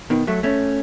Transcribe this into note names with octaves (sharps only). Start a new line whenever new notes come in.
B2 D#3
F#3 A3
A3 C#4